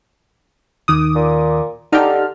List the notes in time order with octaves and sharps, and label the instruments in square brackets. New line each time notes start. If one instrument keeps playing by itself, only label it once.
[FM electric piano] D#2 D#3 D6 [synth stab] D#6
[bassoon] A#2
[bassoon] D3 [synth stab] D#4 G4 [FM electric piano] A5 C6 F6